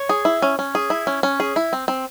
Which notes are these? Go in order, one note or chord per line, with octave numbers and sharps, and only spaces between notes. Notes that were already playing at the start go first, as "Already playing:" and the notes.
Already playing: C#5
G#4
E4
C#4
C#4
G#4
E4
C#4
C#4
G#4
E4
C4
C4